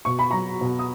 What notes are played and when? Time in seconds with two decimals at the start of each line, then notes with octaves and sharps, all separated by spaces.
0.05 B2 C#6
0.19 B5
0.30 F#3 A#5 C#6
0.61 B2
0.79 D#6